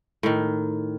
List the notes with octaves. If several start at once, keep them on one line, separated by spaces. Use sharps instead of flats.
A2 D#3